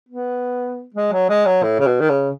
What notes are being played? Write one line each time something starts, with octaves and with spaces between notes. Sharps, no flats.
B3
G#3
F#3
G#3
F#3
A2
C#3
B2
D#3
C#3